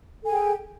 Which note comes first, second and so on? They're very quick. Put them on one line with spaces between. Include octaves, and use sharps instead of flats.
A4 G#5 G#4 G5